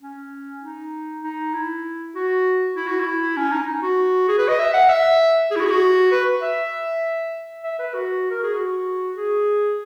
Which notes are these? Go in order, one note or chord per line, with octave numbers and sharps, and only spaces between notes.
C#4
D#4
D#4
E4
F#4
E4
F#4
E4
C#4
D#4
F#4
G#4
B4
D#5
E5
F#5
E5
G#4
E4
F#4
G#4
F#4
B4
E5
E5
B4
F#4
A#4
G#4
F#4
G#4